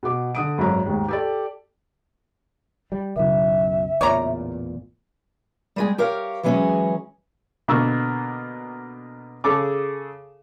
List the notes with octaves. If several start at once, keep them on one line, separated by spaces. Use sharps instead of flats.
B2 D6
D3 D#6 D7
G#1 F#2 A#5
D#2 G#2
G4 A4 D5
G3
B1 F#2 C#3 E4 E5
A1 E2 A#2 C#5 D5 A#5
G3 G#3 G#4
G4 A#4 C#5 F5
E3 F#3 G#3 C#4 G#4 C#5
B2 D3 A#3 C#6 E6
C#3 G#4 A4 A5 D6